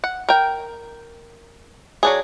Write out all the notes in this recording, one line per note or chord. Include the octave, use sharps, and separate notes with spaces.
F#5
A#4 G5
F#3 D4 G#4